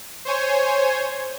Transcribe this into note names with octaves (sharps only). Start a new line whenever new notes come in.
C5 C#5 G#5